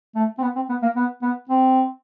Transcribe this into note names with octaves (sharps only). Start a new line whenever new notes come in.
A3
C4
B3
C4
B3
A#3
B3
B3
C4